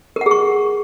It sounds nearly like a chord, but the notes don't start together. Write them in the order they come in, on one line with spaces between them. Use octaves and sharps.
A#4 F#5 G#4 C#6